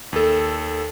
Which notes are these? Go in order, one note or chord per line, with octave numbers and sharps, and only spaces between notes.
D#2 A4